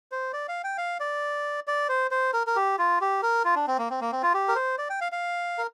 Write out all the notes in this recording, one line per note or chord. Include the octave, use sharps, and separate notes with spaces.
C5
D5
F5
G5
F5
D5
D5
C5
C5
A#4
A#4
G4
F4
G4
A#4
F4
D4
C4
A#3
C4
A#3
C4
F4
G4
A#4
C5
D5
G5
F5
F5
A#4